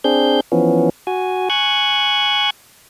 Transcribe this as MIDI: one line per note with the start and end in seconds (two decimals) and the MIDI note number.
0.04 0.40 60
0.04 0.40 62
0.04 0.40 68
0.04 0.40 91
0.52 0.89 52
0.52 0.89 53
0.52 0.89 59
0.52 0.89 61
1.07 1.49 66
1.07 1.49 80
1.50 2.50 80
1.50 2.50 85
1.50 2.50 90
1.50 2.50 92